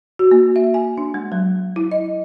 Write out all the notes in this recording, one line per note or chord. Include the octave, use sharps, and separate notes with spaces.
F#4
A#3
E5
G#5
D4
G#3
F#3
E4
D#5